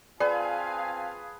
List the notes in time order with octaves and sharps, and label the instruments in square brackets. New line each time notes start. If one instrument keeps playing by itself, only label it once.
[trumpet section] C4 G#5 A5 [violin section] F4 F5 [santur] G#4 B4 [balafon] D5